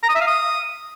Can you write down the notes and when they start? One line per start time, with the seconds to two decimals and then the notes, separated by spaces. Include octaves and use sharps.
0.03 A#5
0.09 D#6
0.15 E5
0.21 F5
0.27 D#6